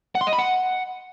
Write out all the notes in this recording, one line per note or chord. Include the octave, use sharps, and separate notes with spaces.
F#5
C6
D#5
B5
F#5